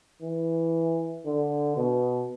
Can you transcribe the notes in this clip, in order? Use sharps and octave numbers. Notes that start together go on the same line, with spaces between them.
E3
D3
B2